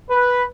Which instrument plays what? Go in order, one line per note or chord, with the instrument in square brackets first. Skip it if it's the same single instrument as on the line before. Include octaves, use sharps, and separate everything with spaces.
[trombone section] B4